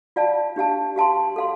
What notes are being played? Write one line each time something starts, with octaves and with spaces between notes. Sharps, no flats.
F4 D5 F5 A5
D4 G4 F5 A5
G4 F5 A5 C6
A4 F5 C6